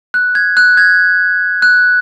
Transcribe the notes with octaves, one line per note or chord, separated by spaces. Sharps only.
F#6
G#6
F#6
G#6
F#6